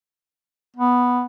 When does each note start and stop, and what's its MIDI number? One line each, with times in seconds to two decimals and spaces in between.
0.76 1.25 59